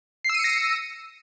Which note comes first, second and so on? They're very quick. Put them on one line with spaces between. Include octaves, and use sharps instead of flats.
C7 E6 D#7 C#7 A#6